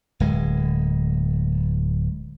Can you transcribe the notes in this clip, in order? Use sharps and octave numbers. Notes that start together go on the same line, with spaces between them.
D1 G#3